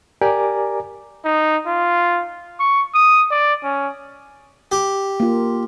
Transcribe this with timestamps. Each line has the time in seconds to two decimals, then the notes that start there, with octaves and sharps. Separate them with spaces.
0.21 G4 A#4 D5 G#5 A#5 D6
1.25 D#4
1.67 F4
2.60 C#6
2.94 D#6
3.31 D5
3.64 C#4
4.72 G4
5.20 A#3 F4